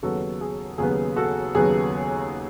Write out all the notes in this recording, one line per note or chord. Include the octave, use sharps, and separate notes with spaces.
D#2 C#3 F#3 B3 F#4 A4
G#4
D#2 C#3 F#3 B3 G#4
F#4 A4
D#2 C#3 F#3 B3 G#4